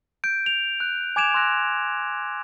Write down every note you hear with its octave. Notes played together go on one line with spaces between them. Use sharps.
G6 D7
F7
F#6
G#5 D6 G#6 D7 E7 F7
C6 E6 F#6 A#6